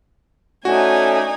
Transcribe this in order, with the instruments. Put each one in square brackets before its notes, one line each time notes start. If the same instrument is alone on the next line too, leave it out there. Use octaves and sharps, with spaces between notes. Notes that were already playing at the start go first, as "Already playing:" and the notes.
[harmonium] A3 C#4 [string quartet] D#4 D5 G#5 [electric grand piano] F#4